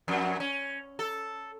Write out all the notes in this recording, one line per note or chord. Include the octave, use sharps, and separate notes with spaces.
F2
C#4
A4